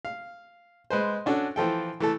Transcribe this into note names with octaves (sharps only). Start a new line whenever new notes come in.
F5
G#3 B4 C5
C#4 D4 F#4 A4
E3 F3 A4 G5
E3 A3 A4